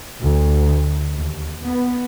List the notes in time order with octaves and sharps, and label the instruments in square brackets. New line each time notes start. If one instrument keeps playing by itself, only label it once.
[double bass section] D2
D#2
B3